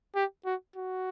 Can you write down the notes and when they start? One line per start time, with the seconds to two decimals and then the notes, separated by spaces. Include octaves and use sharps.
0.15 G4
0.45 F#4
0.76 F#4